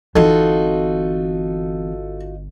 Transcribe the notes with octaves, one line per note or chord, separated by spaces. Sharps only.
G1 E3 C4 D#4 F4 F#4 A4